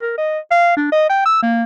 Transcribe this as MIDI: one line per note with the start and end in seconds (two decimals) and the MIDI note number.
0.02 0.15 70
0.18 0.39 75
0.51 0.73 77
0.77 0.90 62
0.92 1.07 75
1.10 1.22 79
1.26 1.41 88
1.42 1.64 58